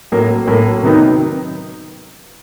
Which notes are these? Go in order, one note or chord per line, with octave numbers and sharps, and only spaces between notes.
A2 F#3 A#3
A2 F#3 A#3
C3 D#3 F#3 B3 D#4